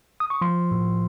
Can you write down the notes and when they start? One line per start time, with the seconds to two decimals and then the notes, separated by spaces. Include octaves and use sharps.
0.20 D#6
0.30 C#6
0.41 F3 C6
0.71 A2